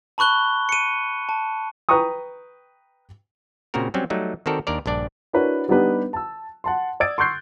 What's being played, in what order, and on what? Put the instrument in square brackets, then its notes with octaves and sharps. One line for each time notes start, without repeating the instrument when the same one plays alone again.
[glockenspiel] A5 B5 C#6 F#6 G7
C#7 D#7
A5
[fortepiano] B4 G5 A#5 C#6 D#6
[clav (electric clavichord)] A#2 C#3 C4 F#4 A#4
F#3 G3 C4 C#4
F#3 G3 A3 D#4
D#3 C4 F#4 A4 A#4 D5
D#2 D4 A#4 D5
A#1 G2 D4 D5
[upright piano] D4 E4 F#4 A#4 B4 C#5
G3 B3 D4 D#4 G4 B4
A5 E6
F#5 A5 C6
D5 D#6 E6 G#6 A6 D7
C6 C#6 E6 F#6 G6 C7